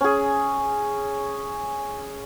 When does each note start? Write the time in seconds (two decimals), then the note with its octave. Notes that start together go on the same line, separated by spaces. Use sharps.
0.01 C#4 G#4